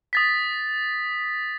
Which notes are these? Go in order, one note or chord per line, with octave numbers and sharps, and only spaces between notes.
D#6 A6 B6